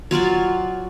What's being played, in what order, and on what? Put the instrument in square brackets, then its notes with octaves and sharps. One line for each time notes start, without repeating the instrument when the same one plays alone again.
[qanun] F#3 F4 D5 G#5